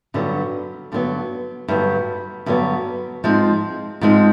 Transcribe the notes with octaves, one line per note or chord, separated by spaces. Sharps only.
G2 D3 F#3 B3
G2 D3 F#3 B3
G2 D3 F#3 B3
G2 D3 F#3 B3
G#2 F3 G#3 C4
G#2 F3 G#3 C4